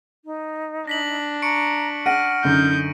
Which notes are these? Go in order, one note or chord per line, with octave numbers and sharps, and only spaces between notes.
D#4
D4 A#6 B6 F#7
A#5 C#6 C#7 D7
F#5 F6 A#6 D7 D#7
F#2 D3 D#4 G6